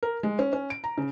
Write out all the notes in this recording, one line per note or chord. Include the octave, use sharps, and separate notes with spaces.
A#4
G#3
C#4
C#4
D7
A#5
C#3